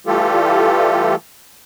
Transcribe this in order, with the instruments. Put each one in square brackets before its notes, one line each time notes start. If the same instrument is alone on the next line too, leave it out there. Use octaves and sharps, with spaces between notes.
[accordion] E3 G3 A3 F4 G4 A4